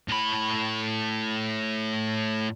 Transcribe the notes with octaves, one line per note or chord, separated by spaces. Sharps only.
A2 B5